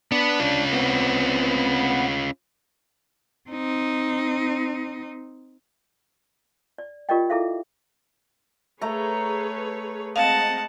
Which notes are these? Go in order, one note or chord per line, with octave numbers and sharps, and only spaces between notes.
B3 D4
C#4 F4
B3 C4
C4 D#4
D5
F4 G4 A#4 D5 D#5 G5
E4 G#4 A4 E5 F5
A3 G#4 B4 C#5 A#5
G#3 C4 D#5 F5 F#5 A5